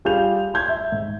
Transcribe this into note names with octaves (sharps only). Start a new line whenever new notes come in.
G3 F4 G#4 G6 F7
C6 G6 G#6
E5
G#2